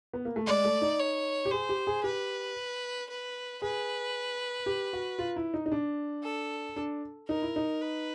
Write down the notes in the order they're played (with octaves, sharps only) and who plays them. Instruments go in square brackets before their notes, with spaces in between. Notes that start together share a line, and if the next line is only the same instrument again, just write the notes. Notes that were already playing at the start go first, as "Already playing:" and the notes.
[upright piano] B3
A#3
A3
[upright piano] G#3 [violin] D5
[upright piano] A3
D#4
[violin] C#5
[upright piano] G4
[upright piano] G#4 [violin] C5
[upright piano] G4
G#4
[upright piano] G4 [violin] B4
[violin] B4
[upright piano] G#4 [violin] B4
[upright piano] G4
F#4
F4
E4
D#4
D#4
D4
[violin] A4
[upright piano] D4
[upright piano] D#4 [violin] A#4
[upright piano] E4
D#4
[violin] B4